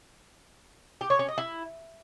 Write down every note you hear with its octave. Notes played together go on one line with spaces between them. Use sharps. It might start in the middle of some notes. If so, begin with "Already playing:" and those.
G4
C#5
C#4
D#5
E4